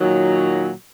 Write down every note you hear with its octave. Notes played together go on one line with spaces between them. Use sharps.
A#2 D#3 F#3